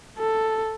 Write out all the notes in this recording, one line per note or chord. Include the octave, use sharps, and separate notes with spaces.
A4